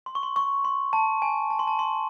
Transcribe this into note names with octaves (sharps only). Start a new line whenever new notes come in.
C6
C#6
C6
C#6
C6
A5
G#5
A5
C6
A5
C6